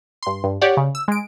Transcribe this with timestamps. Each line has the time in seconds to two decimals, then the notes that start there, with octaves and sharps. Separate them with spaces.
0.23 G2 C6
0.44 G2
0.61 G4 C#5 D5 F#5
0.77 C#3
0.95 E6
1.08 G#3 D7